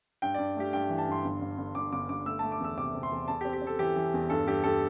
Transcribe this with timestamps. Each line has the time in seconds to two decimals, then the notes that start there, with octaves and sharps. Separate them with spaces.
0.22 G2 G5
0.34 G2 D5
0.57 A3 G4
0.73 G2 G5
0.89 E3
0.98 A5
1.07 G2 C6
1.24 G1
1.42 G1
1.58 G1
1.75 G2 D6
1.93 G1 D6
2.09 G1 D6
2.25 A3 E6
2.39 A3 A5
2.52 D6
2.60 E2 E6
2.77 C3 D6
2.94 C3
3.03 C6
3.12 E2
3.28 E2 A5
3.41 G4
3.45 C4
3.53 G4
3.62 C4
3.67 A4
3.79 E3 G4
3.96 E3
4.14 E2
4.30 G2 A4
4.47 G2 G4
4.64 G2 A4